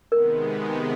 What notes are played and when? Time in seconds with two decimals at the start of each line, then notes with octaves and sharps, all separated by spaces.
0.12 C3 D#3 G#3 B3 A#4